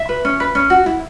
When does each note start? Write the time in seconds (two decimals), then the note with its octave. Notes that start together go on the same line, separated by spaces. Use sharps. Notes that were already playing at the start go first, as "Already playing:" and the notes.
Already playing: E5
0.09 B4
0.25 C#4
0.40 B4
0.55 C#4
0.70 F#4
0.86 E4